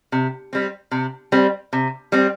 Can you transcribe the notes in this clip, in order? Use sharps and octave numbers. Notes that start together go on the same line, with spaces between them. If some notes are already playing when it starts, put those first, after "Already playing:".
C3
G3 C4
C3
G3 C4
C3
G3 C4